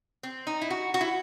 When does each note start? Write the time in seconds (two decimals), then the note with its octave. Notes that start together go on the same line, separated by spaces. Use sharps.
0.23 C4
0.47 D#4
0.62 E4
0.70 F#4
0.94 F#4
1.01 E4